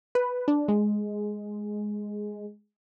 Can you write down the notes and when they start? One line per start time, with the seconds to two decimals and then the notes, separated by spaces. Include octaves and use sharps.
0.15 B4
0.48 D4
0.68 G#3